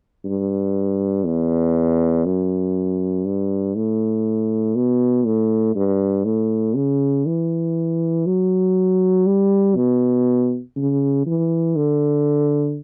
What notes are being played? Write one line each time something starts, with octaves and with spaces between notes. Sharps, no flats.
G2
E2
F#2
G2
A2
B2
A2
G2
A2
C#3
E3
F#3
G3
B2
C#3
E3
D3